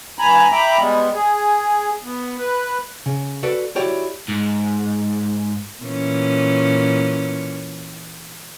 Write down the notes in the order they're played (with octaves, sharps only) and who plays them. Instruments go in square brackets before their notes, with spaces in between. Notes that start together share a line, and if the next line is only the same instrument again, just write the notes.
[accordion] G2 G#5 A#5 B5
E5 G5 A#5 B5 D6
G3 G#3 B3
G#4
B3
B4
[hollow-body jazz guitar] C#3
F#4 A4 B4 D5
E4 F#4 G4 C#5 D5
[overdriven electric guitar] G#2
[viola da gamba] A#2 E3 C#4